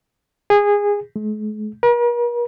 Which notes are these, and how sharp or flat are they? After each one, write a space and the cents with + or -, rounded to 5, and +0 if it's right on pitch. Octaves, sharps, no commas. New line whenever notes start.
G#4 -20
G#3 +45
A#4 +45